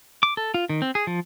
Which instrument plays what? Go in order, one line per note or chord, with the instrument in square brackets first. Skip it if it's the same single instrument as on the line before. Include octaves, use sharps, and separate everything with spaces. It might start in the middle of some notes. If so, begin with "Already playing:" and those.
[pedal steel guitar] D6
A4
F4
D#3
C4
G#4
F3